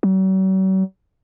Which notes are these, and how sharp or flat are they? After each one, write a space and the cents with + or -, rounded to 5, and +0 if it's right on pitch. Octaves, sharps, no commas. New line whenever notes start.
F#3 +45